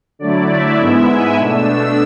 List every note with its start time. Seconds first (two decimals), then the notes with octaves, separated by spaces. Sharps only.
0.19 D3 F#3 A3 E4 D5
0.48 E5
0.79 G#2 G#3 B3 E4 E5
1.08 G#5
1.37 B2 A3 D4 E6